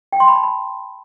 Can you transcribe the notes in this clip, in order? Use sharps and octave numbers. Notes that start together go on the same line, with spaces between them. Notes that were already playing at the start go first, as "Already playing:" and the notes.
G5
C6
B5
A5
B5